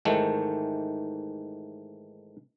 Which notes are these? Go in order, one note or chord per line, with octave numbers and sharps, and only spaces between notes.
G#2 D#3 E3 A3